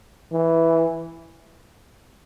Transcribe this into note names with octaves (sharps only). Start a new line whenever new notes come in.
E3